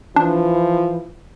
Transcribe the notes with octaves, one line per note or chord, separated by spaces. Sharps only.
E3 F3 D4